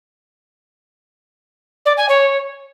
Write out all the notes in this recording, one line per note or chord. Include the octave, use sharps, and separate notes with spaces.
D5
G#5
C#5